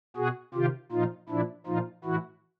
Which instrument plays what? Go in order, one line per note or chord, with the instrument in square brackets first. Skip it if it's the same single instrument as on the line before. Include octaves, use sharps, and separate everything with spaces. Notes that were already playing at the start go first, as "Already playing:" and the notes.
[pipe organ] B2 F#4 G#4
C3 D#3 F4 G4
A#2 F3 D#4 F4
A#2 F3 D4 E4
A#2 F3 D#4 F4
A2 E3 E4 F#4